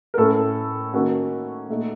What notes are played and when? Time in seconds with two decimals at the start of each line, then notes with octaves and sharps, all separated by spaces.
0.14 A#4
0.18 A2 A3 C#4 A4
0.93 D#3 A#3 C#4 F#4
1.68 A#2 A3 D#4